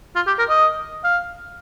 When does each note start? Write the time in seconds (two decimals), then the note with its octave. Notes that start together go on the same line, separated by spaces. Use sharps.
0.16 F4
0.27 G4
0.39 A#4
0.49 D#5
1.04 F5